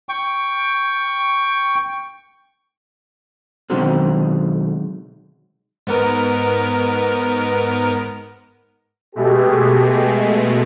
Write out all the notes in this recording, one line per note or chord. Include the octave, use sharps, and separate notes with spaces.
G5 C#6
B2 D3 D#3 F#3 G#3 C4
G#2 B3 A#4
B2 G#3 A3 G4 G#4